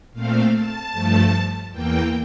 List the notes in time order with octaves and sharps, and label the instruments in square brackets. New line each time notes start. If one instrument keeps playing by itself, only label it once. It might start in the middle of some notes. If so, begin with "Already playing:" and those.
[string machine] A#2 A3 C4 F5
A5
G2 F3 A3
E2 E3 A#3 G5